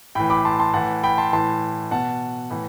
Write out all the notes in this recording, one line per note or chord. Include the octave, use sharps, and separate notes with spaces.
A2 E3 G5 B5
B5 D6
A5 C6
A5 C6
A2 E3 F#5 A5
G5 B5
A5 C6
A2 E3 A5 C6
B2 F#5 A5
A2 E3